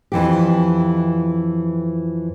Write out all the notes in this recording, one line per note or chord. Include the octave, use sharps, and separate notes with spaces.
F2 E3 G4